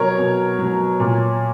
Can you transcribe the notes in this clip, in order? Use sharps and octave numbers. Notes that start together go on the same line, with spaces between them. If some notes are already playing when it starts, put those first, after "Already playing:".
Already playing: B2 F#3 A#4 C#5
B2
F#3
A#2